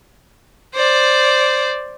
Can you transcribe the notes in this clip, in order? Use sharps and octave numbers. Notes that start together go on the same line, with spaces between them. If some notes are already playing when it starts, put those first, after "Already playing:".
C5 D5